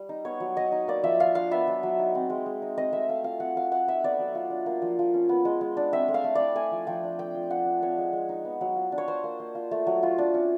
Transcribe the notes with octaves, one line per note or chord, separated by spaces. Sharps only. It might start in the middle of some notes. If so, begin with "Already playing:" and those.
Already playing: G3
D#4
B3 C#5
F#3
F#3 D#5
D#4
A#3 D5
F3 E5
F4 F5
D4 F5
B3 E5
F#3
F#3
D#4
C4
G#3
G#3
D#4
C4 D#5
A3 E5
A3 F5
F4 F5
C4 F#5
A3 F5
A3 F#5
D#4 E5
B3 D5
F#3
F4
D4
A#3
F3
F3
C#4
B3
G#3
G#3
D4
C4 E5
A3
F5
A3
E4 D5
A3 G#5
F3
F3 G5
D4
A3 G5
F3
F3 F#5
D4
C4 C#5
G#3
G#3
D#4
B3
F#3
F4
D4
C#5
D4 C5
A#3
A#3
F4
A3
F#3
F4
D4
C#4